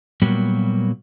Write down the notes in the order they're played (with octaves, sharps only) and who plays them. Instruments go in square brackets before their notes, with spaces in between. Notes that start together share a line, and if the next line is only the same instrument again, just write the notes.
[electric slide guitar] A#2 F#3 G3 A#3 B3 F#4